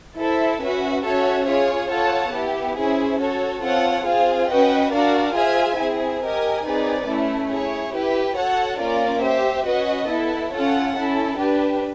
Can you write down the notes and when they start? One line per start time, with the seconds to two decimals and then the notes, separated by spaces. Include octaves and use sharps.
0.17 E4 A4 C5 E5
0.60 C#4 F#4 B4 E5
1.04 C#4 F#4 A4 C#5 E5
1.47 F4 G#4 C#5
1.90 F4 A4 C#5 F#5 A5
2.33 B3 E4 G4
2.76 C#4 E4 G#4 C5
3.19 F#4 A4 C#5
3.62 C4 F4 A4 C#5 F#5
4.05 C4 F4 G#4 C5 F5
4.48 C#4 F#4 B4 D#5 G5
4.91 D4 F#4 A#4 D5 F5
5.34 F4 G#4 C5 E5 G#5
5.78 C4 E4 G#4
6.21 G4 A#4 D#5 G#5
6.64 C4 D#4 G#4 B4 D5
7.08 A3 C#4 E4
7.50 E4 G#4 C#5
7.93 E4 G4 B4
8.37 F#4 A4 C#5 F#5
8.79 A#3 C#4 F4 A#4 D5
9.22 G4 C5 E5
9.66 C#4 F#4 B4 D#5
10.09 B3 E4 A4
10.53 C#4 F4 A4 C#5 F#5
10.96 C#4 E4 A4
11.38 D4 G4 B4